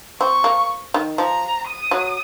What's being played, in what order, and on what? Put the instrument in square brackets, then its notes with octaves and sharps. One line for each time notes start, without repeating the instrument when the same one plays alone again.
[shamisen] C4 [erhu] C#6
[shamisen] A#3
D#3
[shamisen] F3 [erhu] A#5
[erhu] D#6
[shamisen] F#3